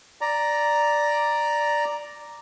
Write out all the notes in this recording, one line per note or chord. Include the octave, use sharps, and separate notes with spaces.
D5 A#5